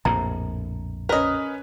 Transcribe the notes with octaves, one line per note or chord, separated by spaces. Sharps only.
A#1 F2 A2 A#5
C#4 A#4 B4 D#5